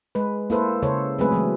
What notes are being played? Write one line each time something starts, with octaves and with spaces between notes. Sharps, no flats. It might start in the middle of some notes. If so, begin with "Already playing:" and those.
G#3 B4
A#3 E4 A4 B4 C5
C#3 A4 C5 C#5
F#3 G#3 A3 C4 G#4 B4
E3 F#3 G#3